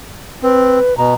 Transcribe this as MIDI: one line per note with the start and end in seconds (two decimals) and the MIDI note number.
0.43 0.79 60
0.43 0.96 71
0.97 1.14 47
0.97 1.14 82